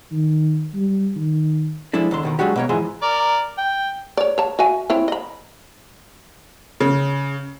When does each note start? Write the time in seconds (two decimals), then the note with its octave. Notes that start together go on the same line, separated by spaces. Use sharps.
0.12 D#3
0.75 G3
1.16 D#3
1.93 F3 G#3 D4 E4 A4
2.11 D#2 D3 C6
2.23 D#2 B2 D#3
2.39 F#3 G#3 D4 F#4 G4
2.56 B2 A#3 C#5
2.69 G#2 E3 F3 G#4 C6
3.02 A#4 D5
3.58 G5
4.17 C#5 D5
4.38 C#5 A5
4.59 F#4 E5 G#5
4.90 C4 E4 C#5
5.08 D#5 B5
6.80 C#3